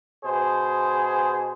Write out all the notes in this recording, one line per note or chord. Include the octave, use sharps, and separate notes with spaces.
B2 G#4 C5